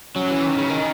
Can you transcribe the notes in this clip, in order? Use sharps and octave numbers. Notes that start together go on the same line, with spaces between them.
F#3 C#4
E3
D#3
C#3
D#3